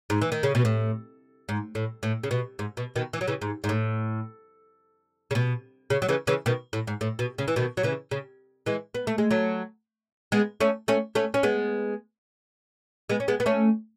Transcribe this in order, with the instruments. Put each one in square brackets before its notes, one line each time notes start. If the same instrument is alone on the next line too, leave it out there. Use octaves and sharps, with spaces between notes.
[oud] G#2
E3
D#3
C#3
B2
A2
G#2
A2
A2
C#3
B2
G#2
B2
B2 D#3
E3
F#3
C#3 E3
G#2
G#2
A2
C#3
B2
C#3
F#3
C#3 E3
C#3 E3
B2 D#3
A2
G#2
A2
B2
C#3
E3
B2 D#3
F#3
C#3 E3
C#3
E3 G#3
B3
A3
G#3
F#3 A3
G#3 B3
A3 C#4
A3 C#4
A3 C#4
C#4
G#3 B3
G#3 B3
C#4
G#3 B3
B3
A3 C#4